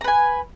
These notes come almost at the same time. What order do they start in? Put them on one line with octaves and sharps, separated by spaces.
A#5 B4 G#5